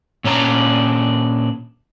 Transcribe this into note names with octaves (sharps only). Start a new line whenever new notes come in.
A#2 C#4 D4 A#5